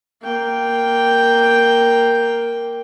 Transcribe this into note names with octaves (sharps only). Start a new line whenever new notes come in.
A#3 G5